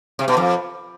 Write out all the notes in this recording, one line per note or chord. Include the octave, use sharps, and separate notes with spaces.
C3
B2
F2